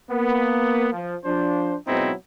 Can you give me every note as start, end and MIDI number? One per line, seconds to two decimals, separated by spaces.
0.10 0.88 58
0.10 0.88 59
0.93 1.14 53
1.25 1.75 53
1.25 1.75 62
1.25 1.75 72
1.88 2.12 44
1.88 2.12 47
1.88 2.12 54
1.88 2.12 60
1.88 2.12 63
1.88 2.12 64